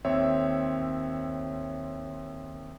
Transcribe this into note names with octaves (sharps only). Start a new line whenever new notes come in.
D#2 C4 C#5 E5